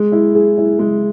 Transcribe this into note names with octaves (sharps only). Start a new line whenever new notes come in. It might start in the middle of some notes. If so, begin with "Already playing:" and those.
Already playing: G#3
E4
G#4
E4
G#3